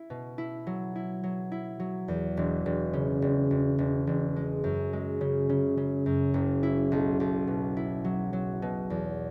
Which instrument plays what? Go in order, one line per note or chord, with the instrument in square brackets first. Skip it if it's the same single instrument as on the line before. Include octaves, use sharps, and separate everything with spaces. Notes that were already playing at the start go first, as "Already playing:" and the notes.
Already playing: [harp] E4
B2
E4
F#3
E4
F#3
E4
F#3
E2
E1
E1
C#3
E1
E1
E1
E1
G#3
F#2
G#3
C#3
C#3
C#3
F#2
F#1
E4
B1
B1
B2
E4
F#3
F#3
B2
E2